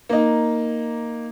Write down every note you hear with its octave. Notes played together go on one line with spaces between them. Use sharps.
A#3 D#4